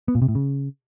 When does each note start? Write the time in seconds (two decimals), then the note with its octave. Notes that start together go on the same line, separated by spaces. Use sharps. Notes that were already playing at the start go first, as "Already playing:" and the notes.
0.08 B3
0.15 A#2
0.22 C3
0.28 A2
0.35 C#3